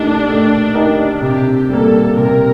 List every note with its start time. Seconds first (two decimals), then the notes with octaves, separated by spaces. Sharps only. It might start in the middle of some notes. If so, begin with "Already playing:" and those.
Already playing: A3 D4 D#4 G4 A#4 D#5
0.27 A3
0.74 D#4 G4 A#4 D#5
1.22 C3 G4
1.69 G3 A#3 A4
2.16 C3 A#4